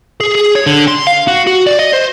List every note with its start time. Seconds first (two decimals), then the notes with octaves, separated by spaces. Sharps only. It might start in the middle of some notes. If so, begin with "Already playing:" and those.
0.20 G#4
0.35 G#4
0.55 C#5
0.66 D3
0.88 C6
1.07 F5
1.28 F#4
1.47 F#4
1.67 D5
1.79 D#5
1.93 C5